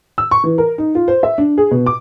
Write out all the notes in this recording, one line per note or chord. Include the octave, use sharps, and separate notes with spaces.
E6
C#6
E3
A#4
D#4
F4
C5
E5
D4
G#4
B2
D6